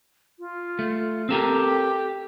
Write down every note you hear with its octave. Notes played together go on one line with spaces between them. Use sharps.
F4
A3
C4 G4 A4 A#4